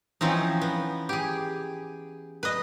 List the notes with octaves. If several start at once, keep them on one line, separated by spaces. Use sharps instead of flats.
E3 F3 C4 C#4 D#4
B3
G4 G#4
B4 D#5